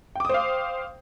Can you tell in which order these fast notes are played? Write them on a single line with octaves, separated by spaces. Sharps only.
G5 D6 D#6 C5 F5